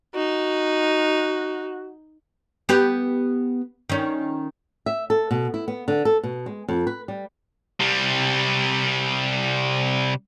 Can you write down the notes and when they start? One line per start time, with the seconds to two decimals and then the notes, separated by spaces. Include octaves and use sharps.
0.15 D#4 F#4
2.69 B3 G4 B4
3.89 D#3 C#4
4.86 E5
5.10 A4
5.31 B2
5.54 E4
5.68 B3
5.88 D3
6.05 A4
6.23 B2
6.46 G#3
6.68 F2
6.87 B4
7.08 G3
7.80 C3 G3